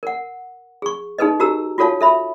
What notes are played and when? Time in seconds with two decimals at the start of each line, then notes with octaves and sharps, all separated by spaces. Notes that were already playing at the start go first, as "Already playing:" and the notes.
0.03 A#4 F#5
0.82 G#4 C#6
1.18 D#4 G#4 A4 B4 D#5
1.40 F#4 G4 A#4 A#5 E6
1.78 F4 F#4 A4 C#5 F5 A5
2.01 A4 E5 B5